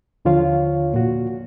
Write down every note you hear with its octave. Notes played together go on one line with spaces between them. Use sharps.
D#2 D3 F3 F4 C#5 F5
A#2 F#4